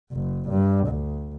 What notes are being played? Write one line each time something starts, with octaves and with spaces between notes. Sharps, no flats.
F#1
G2
D2